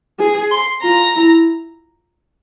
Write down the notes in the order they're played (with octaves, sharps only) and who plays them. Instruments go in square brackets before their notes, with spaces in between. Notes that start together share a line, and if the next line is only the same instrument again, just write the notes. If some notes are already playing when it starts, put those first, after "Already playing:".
[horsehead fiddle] G#4
[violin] C6
[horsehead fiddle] F4 [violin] A#5
[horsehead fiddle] E4